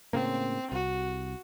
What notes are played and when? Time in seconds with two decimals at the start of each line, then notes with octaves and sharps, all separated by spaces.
0.13 A2 C#3 A#3 C4
0.72 C2 F#4